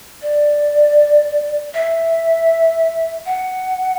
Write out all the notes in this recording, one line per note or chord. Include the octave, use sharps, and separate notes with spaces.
D5
E5
F#5